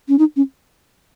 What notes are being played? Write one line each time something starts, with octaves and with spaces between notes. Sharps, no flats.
C#4
D#4
C#4